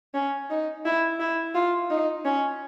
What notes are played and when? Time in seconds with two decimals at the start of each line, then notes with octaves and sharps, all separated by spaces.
0.14 C#4
0.50 D#4
0.86 E4
1.20 E4
1.55 F4
1.90 D#4
2.25 C#4